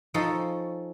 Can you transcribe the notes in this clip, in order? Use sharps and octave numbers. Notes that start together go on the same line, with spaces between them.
F3 C#4 D#4 A4 C#5